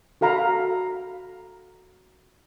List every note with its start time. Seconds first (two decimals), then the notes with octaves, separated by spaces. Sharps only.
0.21 F#4 A4 F5 A#5 B5